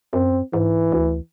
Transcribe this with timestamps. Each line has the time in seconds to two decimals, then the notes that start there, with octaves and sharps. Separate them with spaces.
0.13 F#2 C4
0.53 G#2 E3
0.92 D2